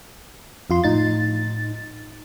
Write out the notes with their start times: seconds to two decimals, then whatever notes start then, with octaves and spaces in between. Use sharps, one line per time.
0.70 F2 F4 C6
0.84 A2 D#4 A6